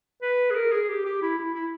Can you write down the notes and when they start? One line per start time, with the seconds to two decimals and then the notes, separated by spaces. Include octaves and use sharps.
0.22 B4
0.51 G#4
0.55 A#4
0.72 G#4
0.89 G4
1.05 G4
1.22 E4
1.38 E4
1.54 E4